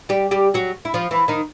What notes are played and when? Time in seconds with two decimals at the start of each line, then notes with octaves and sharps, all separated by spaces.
0.09 G3 G4
0.31 G3 G4
0.54 F#3 F#4
0.85 E4
0.94 F3 F4
1.11 E3 E4
1.28 D#3 D#4